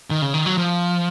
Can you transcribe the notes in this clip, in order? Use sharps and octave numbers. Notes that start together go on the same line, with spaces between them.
D#3
C#3
D#3
F#3
F3